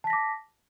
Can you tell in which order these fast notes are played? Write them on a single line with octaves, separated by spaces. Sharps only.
A5 B6 A#6 D6